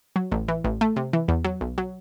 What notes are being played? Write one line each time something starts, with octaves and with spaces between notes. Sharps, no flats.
F#3
A1
E3
A1
A3
C3
E3
E2
F#3
B1
F#3